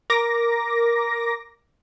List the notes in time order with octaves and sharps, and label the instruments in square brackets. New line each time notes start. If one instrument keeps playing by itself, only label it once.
[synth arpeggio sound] A#4 D6 A#6